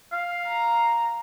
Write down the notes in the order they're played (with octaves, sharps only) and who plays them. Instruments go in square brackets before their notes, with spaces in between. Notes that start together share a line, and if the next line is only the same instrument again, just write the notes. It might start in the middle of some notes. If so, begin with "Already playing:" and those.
[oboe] F5
[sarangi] A#5